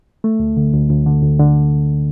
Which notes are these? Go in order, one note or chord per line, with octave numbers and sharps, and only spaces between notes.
A3
D2
D3
D2
D2
D3
D2
D3